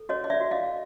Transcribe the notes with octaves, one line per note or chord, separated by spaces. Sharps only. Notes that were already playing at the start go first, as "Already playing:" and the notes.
Already playing: A4
F#4 C#5 D#5
D#5
D5 E5
F#4
D#5 F5